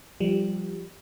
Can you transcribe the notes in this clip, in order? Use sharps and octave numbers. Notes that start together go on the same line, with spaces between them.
F3 G3